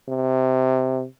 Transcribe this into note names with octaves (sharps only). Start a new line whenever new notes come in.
C3